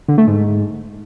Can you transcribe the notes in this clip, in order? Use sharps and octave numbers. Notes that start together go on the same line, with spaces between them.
D3
A3
G#2